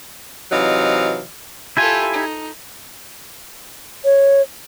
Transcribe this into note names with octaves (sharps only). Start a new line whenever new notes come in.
C3 E3 F#3 D#4 D#5 F5
E4 F4 G4 A4 G#5
D#4
C#5